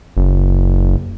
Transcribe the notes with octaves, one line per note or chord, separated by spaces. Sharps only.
F#1